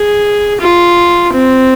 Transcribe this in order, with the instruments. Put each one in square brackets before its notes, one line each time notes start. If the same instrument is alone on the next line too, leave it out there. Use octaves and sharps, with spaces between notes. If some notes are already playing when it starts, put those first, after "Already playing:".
Already playing: [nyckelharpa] G#4
F4
C4